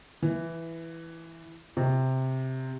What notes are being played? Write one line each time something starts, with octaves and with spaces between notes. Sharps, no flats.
E3
C3